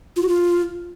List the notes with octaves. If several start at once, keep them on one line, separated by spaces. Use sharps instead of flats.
F4
F#4
F4